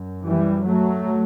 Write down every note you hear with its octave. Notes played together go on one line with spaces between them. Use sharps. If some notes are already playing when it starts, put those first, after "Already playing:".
Already playing: F#2
E3 G3
F#3 A3